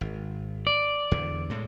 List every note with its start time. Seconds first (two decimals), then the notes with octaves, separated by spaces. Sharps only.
0.01 G#1
0.67 D5
1.11 E2 D3
1.50 A2 G#3